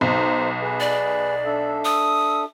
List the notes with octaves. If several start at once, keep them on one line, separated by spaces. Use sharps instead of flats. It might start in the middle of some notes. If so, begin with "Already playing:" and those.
B1 D#4 C5
G#4 B4
D5
D4 A4 E5
D#6